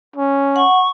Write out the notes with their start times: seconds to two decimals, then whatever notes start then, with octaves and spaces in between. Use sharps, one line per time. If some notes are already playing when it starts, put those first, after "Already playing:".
0.16 C#4
0.56 F#5 C#6